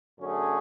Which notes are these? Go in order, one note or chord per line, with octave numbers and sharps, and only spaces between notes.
F#2 D3 A3 C#4 G#4